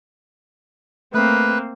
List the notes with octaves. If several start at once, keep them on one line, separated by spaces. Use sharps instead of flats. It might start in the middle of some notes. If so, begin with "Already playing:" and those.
A3 A#3 C4 B4